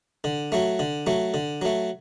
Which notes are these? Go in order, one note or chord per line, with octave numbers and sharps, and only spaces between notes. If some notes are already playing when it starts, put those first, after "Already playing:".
D3
F#3 A3
D3
F#3 A3
D3
F#3 A3